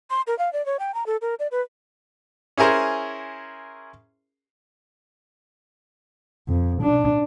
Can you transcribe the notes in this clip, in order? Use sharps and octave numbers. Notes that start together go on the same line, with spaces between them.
C6
A#4
F5
D5
C#5
G5
A#5
A4
A#4
D5
B4
C#4 E4 G#4 A#4 C5
F2
D4